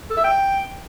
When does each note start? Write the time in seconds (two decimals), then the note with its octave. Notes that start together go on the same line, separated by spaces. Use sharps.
0.10 A4
0.17 E5
0.24 G5